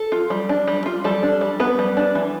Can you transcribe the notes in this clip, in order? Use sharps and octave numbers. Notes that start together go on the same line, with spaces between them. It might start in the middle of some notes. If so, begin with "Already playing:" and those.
Already playing: A4
F4
G3
D4
G3
F4
G3 A4
D4
G3
B3 B4
G3
D4
E3